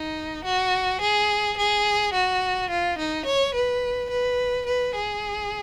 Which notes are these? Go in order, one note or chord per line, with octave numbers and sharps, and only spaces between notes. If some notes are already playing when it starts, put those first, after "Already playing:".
Already playing: D#4
F#4
G#4
G#4
F#4
F4
D#4
C#5
B4
B4
B4
G#4